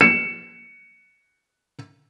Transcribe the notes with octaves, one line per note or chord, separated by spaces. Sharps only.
C#7 E7